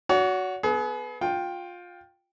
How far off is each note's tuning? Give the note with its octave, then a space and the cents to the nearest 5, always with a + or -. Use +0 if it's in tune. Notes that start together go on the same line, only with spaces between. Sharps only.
F#4 +0 C#5 +45
B3 +0 G#4 +40
F4 +20 G5 +0